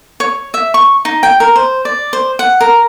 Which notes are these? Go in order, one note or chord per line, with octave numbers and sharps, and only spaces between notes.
C#5
E5
C#6
D#4
G5
A#4
C5
D5
C5
F#5
A#4